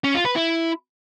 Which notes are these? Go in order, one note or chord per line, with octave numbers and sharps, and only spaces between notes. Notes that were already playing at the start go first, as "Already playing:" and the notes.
C#4
F4
B4
E4